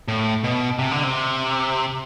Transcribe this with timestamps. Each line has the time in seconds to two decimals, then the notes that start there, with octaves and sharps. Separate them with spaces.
0.08 A2
0.44 B2
0.79 C3
0.91 D3
1.03 C3